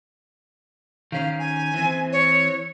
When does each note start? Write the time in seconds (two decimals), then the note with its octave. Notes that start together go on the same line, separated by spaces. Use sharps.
1.12 D#3 C#4 F5
1.39 G#5
1.74 E3 C4
2.12 C#5